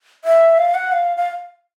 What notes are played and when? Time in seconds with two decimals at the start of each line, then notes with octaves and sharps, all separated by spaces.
0.24 E5
0.58 F5
0.75 F#5
0.92 F5
1.17 F5